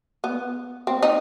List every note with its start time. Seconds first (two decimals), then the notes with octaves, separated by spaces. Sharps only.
0.24 B3
0.87 C4
1.02 D#4